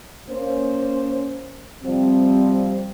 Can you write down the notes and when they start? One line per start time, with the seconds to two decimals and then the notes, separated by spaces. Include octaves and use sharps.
0.30 A#3 C#4 C5
1.84 C3 F3 G3 C4